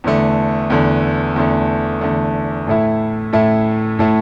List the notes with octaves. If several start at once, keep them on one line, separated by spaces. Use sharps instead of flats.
E2 D3 A3
E2 D3 A3
E2 D3 A3
E2 D3 A3
A2 A3 E4
A2 A3 E4
A2 A3 E4